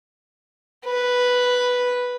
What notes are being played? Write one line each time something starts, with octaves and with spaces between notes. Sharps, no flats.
B4